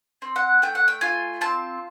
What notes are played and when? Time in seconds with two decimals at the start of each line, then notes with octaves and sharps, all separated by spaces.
0.22 C4
0.36 F#5
0.62 A3 G5
0.75 F#5
0.88 G5
1.01 F4 G#5
1.41 C4 A5